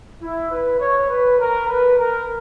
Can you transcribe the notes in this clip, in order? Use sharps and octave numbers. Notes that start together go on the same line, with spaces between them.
E4
B4
C#5
B4
A#4
B4
A#4